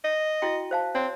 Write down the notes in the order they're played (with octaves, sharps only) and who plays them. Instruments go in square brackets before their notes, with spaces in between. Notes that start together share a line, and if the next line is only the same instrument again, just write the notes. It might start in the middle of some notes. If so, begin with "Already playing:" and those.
[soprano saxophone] D#5
[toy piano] E4 F#4 G5
C5 F5 A5
[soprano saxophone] C4 [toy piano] C#5